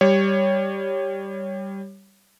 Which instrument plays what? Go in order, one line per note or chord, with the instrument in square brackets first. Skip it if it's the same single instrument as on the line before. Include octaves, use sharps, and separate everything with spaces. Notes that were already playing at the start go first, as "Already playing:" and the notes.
[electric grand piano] G3 C#5